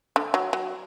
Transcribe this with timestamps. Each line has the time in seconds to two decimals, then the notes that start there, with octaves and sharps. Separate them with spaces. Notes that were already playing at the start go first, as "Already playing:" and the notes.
0.16 D3
0.34 F#3
0.53 F#3